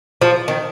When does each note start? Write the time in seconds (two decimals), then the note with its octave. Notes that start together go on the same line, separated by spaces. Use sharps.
0.22 F3
0.48 D#3